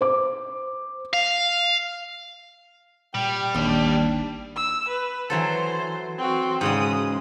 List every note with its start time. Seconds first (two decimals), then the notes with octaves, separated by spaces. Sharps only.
0.01 C5 D6
1.13 F5
3.14 A#2 G3 G5
3.55 G#1 D#2 D4
4.56 E6
4.88 B4
5.30 E3 F#3 A4 C5
6.18 C4 F#4
6.61 G#2 C#3 G#3 D#6